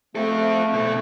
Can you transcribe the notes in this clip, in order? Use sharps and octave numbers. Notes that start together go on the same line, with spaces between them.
A3 C4 A4
B2 A4